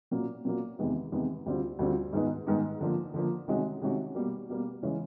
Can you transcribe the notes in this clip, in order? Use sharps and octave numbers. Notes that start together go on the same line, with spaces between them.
A#2 F#3 A#3
A#2 F#3 A#3
E2 C3 D#3 G#3 B3
E2 C3 D#3 G#3 B3
D2 D3 G3 C4 F4
D2 D3 G3 C4 F4
G#2 D#3 G#3 B3 D#4
G#2 D#3 G#3 B3 D#4
D3 F3 A#3
D3 F3 A#3
C3 D#3 G#3 C#4 F#4
C3 D#3 G#3 C#4 F#4
B2 G3 A#3
B2 G3 A#3
C#3 E3 G#3 C#4